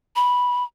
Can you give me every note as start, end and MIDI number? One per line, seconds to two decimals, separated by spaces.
0.16 0.64 83